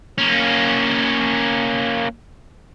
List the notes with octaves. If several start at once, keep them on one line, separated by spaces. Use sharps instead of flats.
A#3 C#4